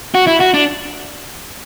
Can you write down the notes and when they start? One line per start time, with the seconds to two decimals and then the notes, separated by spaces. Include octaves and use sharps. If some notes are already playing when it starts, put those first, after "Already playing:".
0.15 F#4
0.27 E4
0.41 F#4
0.54 D4